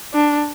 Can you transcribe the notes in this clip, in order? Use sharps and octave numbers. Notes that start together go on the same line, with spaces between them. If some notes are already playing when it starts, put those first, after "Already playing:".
D4